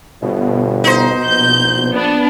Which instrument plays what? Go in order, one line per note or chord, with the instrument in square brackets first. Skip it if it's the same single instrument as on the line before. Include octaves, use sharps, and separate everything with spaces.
[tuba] G1 [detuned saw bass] B2
[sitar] D#4 C5
[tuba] A#1 [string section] G6
[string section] B3 D4